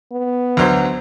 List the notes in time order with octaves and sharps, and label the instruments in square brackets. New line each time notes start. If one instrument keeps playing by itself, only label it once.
[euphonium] B3
[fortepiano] D2 F#3 C5